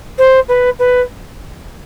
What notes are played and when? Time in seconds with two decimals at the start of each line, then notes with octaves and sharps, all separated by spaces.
0.18 C5
0.48 B4
0.79 B4